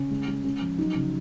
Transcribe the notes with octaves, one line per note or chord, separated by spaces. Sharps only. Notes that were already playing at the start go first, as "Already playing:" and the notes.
Already playing: C#3 C#4
G#3
G#3
G#3 C#4
F3
F#3 D#4
C#3